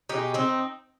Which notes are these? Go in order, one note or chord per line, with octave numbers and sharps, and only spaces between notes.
B2 G#3 D#4 G4
C4 D#4